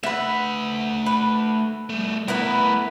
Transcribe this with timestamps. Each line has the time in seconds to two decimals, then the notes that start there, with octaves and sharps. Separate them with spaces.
0.03 A3 B4 E5 F#5
1.06 B4
1.90 G3 A3
2.28 A3 B3 E4 A#4 B4